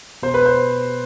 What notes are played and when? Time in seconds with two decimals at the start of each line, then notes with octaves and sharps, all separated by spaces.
0.22 B2 C5
0.34 B4
0.46 C5